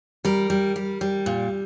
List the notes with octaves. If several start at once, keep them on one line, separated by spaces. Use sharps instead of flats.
G3 A#4
G3
G3
G3
A#2